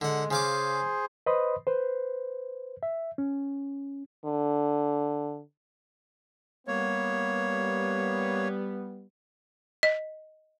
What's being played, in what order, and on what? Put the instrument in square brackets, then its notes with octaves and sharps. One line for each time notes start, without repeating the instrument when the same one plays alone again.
[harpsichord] D3 F#5 [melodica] G#3
[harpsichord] C#3 F5 D6 [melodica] G#4 C5
[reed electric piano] B4 C5 D#5 B5 C6 D#6
B4 C5
E5
C#4
[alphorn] D3
[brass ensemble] G3 B3 [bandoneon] A#3 C#5
[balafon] D#5